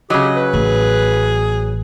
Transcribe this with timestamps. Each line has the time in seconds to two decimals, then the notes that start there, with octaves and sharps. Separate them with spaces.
0.10 C#3 F#3 G4 D#5
0.36 B4
0.54 A1 G#4